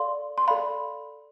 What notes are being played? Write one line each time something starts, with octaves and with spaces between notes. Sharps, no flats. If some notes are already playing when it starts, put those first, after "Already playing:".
Already playing: A4 D5 F5 C6
C6
A4 D5 F5 B5